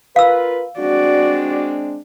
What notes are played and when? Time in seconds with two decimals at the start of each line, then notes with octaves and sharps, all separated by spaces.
0.16 F4 A#4 B4 F5 E6
0.79 G#3 C4 D4 F#4 D5